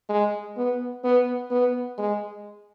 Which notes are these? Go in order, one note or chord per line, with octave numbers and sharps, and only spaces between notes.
G#3
B3
B3
B3
G#3